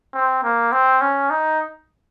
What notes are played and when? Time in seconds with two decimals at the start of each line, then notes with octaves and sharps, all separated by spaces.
0.14 C4
0.43 A#3
0.72 C4
1.01 C#4
1.30 D#4